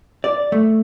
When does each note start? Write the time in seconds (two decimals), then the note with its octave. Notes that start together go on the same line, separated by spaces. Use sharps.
0.24 D5
0.52 A3